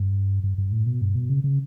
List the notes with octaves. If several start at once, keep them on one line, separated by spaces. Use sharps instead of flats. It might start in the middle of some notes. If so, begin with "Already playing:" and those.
Already playing: G2
G2
G2
A2
B2
G2
B2
C#3
C#3